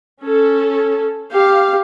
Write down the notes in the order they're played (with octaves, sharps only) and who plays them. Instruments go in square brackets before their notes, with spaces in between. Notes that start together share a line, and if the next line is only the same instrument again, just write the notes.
[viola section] C#4 A4
[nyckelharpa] G4 [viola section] F5